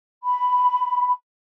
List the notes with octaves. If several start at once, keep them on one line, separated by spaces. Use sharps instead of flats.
B5